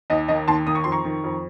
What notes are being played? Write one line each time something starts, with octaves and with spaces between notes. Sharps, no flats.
D#2 D#5
D#3 D#5
D#2 A5 C6
D#3 D#6
C#6
F2 C6
A#5 C#6
D#3
F2